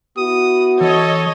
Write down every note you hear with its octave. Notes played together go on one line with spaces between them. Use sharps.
B3 E4 F#4 D#6
E3 A4 C#5 D#5